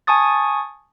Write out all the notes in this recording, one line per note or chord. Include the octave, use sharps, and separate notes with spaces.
G#5 A5 C#6 D#6 A6